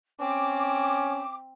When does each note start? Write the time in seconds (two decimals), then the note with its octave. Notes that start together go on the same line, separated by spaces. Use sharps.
0.20 C4 C#4 D6